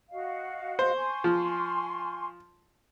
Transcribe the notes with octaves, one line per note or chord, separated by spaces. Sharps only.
F#4 D#5 F5
C5
G#5 C6 C#6
F3